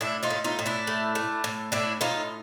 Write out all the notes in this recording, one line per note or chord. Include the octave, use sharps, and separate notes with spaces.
A2 D4 E4
D#4 F4
A2
D#4 F4
A2
D4 E4
A3
A3
A2
A2 D4 E4
A2 D#4 F4